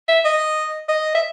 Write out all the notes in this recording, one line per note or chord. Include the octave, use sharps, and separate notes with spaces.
E5
D#5
D#5
E5